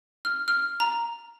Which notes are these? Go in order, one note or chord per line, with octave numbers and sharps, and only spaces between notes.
F6
F6
A#5